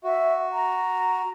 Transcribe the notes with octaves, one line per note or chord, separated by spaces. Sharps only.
F#4 E5
A#5